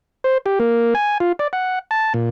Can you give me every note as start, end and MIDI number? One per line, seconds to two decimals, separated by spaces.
0.24 0.38 72
0.46 0.59 67
0.60 0.94 58
0.95 1.18 80
1.20 1.32 65
1.39 1.48 74
1.53 1.79 78
1.91 2.13 81
2.14 2.29 46